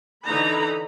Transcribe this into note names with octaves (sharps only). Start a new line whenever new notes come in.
D3 E3 D#4 A#5 B5